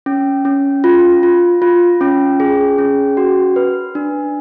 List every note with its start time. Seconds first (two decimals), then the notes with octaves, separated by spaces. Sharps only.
0.06 C#4
0.45 C#4
0.84 F4
1.23 F4
1.62 F4
2.01 C#4
2.40 G#4
2.78 C#4
3.17 F#4
3.56 B4
3.95 D4